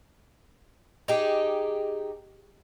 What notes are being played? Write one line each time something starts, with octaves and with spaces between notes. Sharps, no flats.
D#4 G4 G#4